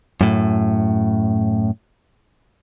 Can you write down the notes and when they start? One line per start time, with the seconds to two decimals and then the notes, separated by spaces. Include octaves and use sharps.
0.21 F#2 A2